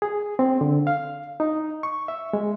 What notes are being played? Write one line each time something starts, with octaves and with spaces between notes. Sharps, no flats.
G#4
C4
D3
F5
D#4
C#6
E5
G#3